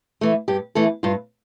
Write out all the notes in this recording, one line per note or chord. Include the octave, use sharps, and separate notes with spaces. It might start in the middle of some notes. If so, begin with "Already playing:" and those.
E3 A3
G2 G4
E3 A3 A4
G2 F4